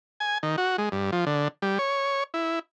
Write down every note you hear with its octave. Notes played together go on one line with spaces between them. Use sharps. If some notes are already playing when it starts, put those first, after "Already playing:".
G#5
D#3
F#4
G#3
G2
F3
D3
G3
C#5
E4